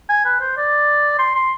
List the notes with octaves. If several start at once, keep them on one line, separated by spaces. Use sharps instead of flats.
G#5
B4
C5
D5
C6
C6